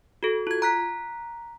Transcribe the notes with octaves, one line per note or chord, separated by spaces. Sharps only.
F#4 A4
F4 G#6
A#5 F#6 B6